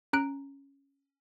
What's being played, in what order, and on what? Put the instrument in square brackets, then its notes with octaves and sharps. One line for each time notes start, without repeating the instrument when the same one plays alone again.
[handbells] C#4 A#5 F#6 D7